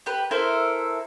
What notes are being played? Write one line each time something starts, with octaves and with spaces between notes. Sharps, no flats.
G4 B4
E4 A4 A#4 C5